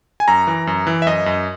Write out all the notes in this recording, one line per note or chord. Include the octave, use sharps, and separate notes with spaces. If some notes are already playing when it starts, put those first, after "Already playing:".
G#5
F#2 A#5
E3
F#2
E3
E5
F#2 D#5
F#2